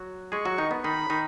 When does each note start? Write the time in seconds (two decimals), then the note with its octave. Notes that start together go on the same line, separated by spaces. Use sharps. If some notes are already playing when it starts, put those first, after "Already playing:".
Already playing: F#3 F#4
0.32 G#3 G#4 C#6
0.45 F#3 F#4
0.58 D#3 D#4
0.71 B3
0.84 D#3 D#4 B5
1.10 D#3 D#4